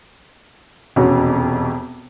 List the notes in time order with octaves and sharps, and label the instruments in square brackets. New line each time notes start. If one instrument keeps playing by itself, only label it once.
[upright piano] E1 F2 C3 C#4 F#4